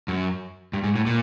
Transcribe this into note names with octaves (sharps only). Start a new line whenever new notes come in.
F#2
G2
G#2
A2
A#2